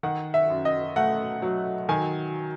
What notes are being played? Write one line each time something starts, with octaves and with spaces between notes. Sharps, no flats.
D#3 F#5
E5
F#2
D#5
A3 F#5
F#3
D#3 G#5